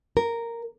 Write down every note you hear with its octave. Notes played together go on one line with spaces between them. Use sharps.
A#4